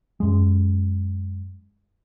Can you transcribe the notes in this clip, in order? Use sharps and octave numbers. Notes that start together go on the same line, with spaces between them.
F#2 G#3